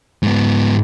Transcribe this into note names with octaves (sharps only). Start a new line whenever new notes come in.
G#2 B3